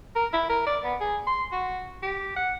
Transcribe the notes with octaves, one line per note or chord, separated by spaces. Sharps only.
A#4
E4
A#4
D5
B3
G#4
C6
F#4
G4
F#5